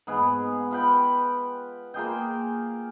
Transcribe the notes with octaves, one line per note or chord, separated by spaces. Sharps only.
G#2 B3 G#4
F4 B4 G5
A#3 F4 G#4 G5